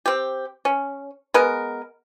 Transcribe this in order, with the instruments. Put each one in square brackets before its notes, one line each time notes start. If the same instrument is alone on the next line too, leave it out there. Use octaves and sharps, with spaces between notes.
[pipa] C4 G4
C#4
G#3 B3 A#4